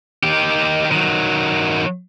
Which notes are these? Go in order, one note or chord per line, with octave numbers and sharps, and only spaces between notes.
D#3 G4
D#3 F#3